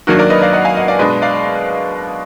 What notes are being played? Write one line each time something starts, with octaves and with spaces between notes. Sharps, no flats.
D#3 F#3 A#3 D4 F#4 A#4
A#4 D5
B4 D#5
D5 F5
D#5 F#5
F5 G#5
D#5 F#5
D5 F5
B2 G#3 D4 B4 D#5
D5 F5